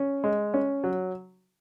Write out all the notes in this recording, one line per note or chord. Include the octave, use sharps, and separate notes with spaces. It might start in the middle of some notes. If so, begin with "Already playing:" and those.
Already playing: C#4
G#3
C#4
F#3